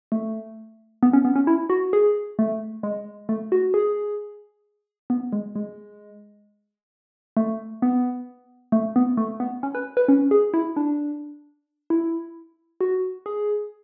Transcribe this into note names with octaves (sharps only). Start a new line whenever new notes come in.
A3
B3
C#4
B3
C#4
E4
F#4
G#4
A3
G#3
A3
F#4
G#4
B3
G#3
G#3
A3
B3
A3
B3
A3
B3
C#4
B4
B4
C#4
G#4
E4
D4
E4
F#4
G#4